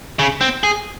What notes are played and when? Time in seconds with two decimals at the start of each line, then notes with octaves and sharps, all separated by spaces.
0.19 C#3
0.41 C4
0.63 G#4